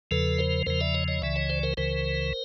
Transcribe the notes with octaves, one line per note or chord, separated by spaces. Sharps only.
E2 C#3 F3 A4 B4
A#4 C5
E2 C#3 F3 A#4 C5
D5 E5
C#5 D#5
C#5 D#5
C#2 C#3 E3 D5 E5
C#5 D#5
C5 D5
A#4 C5
C#2 C#3 E3 A#4 C5